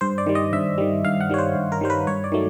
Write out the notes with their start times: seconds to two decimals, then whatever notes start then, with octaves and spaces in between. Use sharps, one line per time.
0.01 G2 C5
0.18 D5
0.27 D#3 G3
0.35 D#5
0.53 G2 E5
0.78 D#3 G3
1.04 G2 F5
1.21 F#5
1.30 D#3 G3 C#5
1.38 C5
1.55 G2
1.72 A#4
1.81 D#3 G3 C5
1.90 B4
2.07 G2 C#5
2.24 D5
2.32 D#3 F#3 A3